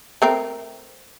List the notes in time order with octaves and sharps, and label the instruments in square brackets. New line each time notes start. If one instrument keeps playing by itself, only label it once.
[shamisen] A3 C4 A#4